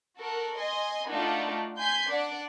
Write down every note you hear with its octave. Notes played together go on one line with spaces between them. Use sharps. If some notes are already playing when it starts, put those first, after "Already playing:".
F#4 A4 A#4
D#5 G#5 C6
A3 D4 D#4 F4 F#4
G#5 C6 G6 G#6 B6
D4 D5 F#5